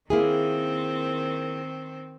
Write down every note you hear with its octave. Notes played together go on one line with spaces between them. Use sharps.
D#3 A#3 C4 E4 G#4